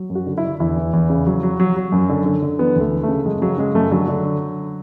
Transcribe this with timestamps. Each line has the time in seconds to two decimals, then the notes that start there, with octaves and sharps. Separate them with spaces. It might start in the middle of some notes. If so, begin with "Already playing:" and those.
Already playing: F#3
0.10 F#2
0.15 F#4
0.26 D3
0.38 E4
0.44 D3
0.60 E2 E4
0.76 E3
0.93 E2
1.10 C#3
1.27 F#3
1.43 F#3
1.60 F#3
1.76 F#3
1.92 F#2
2.09 D3
2.26 D3
2.42 D3
2.59 E3 B3
2.76 D2 A3
2.92 E3
3.03 C#3 A3
3.25 F#2 G#3
3.41 C#3 F#3
3.58 C#3 G#3
3.75 F#2 A3
3.91 D3 F#3
4.08 D3